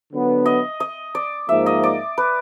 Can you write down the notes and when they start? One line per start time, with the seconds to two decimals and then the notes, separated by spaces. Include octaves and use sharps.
0.12 D3 F#3 B3
0.46 D#5
0.80 D#5
1.15 D5
1.49 G#2 F3 A#3 E5
1.66 D#5
1.83 D5
2.18 B4